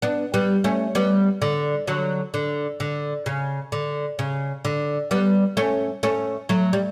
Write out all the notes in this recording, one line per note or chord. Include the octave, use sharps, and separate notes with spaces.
B3 D4
G3 B3
A3 C#4
G3 B3
D3
D3 F#3
D3
D3
C#3
D3
C#3
D3
G3 B3
A3 C#4
A3 C#4
F#3 A3
G3